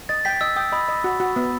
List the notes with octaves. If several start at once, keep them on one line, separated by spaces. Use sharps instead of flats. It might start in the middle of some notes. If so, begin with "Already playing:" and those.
D#5 A6
G5 B6
D#5 E6
G5 D#6
D#5 B5
D#5
F#4
F#4
B3